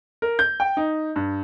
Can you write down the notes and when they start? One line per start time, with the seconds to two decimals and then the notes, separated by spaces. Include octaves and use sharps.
0.22 A#4
0.39 G6
0.60 G5
0.77 D#4
1.16 G2